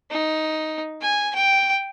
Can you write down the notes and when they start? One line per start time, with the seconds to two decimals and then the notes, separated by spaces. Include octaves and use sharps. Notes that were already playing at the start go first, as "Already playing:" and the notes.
0.11 D#4
1.02 G#5
1.35 G5